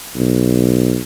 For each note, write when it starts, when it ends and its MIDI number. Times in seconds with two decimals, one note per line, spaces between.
0.16 0.99 35